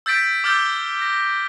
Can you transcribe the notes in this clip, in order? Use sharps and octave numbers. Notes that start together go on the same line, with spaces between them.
E6 G6 A6 B6 D7
D6 E6 F6 G6 A6 G7
A#6